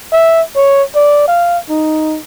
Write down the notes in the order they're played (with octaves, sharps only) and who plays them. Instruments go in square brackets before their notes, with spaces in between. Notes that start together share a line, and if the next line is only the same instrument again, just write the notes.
[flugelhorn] E5
C#5
D5
F5
D#4